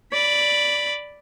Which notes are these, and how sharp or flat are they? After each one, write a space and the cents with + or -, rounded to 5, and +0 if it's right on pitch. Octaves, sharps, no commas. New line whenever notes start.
D5 +0 B5 +0